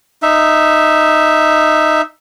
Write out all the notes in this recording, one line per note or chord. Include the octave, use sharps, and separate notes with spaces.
D#4 E5